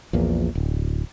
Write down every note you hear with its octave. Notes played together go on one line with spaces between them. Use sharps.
A#1 E2 A#2
D1